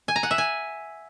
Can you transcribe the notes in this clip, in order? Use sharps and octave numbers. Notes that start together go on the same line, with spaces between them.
G#5
A#5
F#5
E5
G#5